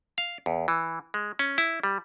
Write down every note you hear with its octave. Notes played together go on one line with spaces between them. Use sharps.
F5
E2
E3
G#3
C#4
E4
G3